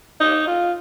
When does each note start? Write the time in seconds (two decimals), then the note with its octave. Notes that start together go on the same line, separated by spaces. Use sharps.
0.20 D#4
0.47 F4